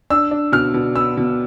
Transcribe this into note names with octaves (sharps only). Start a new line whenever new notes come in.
D4 E6
D4
B2 F6
B2
B3 E6
B2